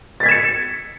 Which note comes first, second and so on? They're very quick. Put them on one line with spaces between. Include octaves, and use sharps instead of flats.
A6 B6 G#6 E7 C#7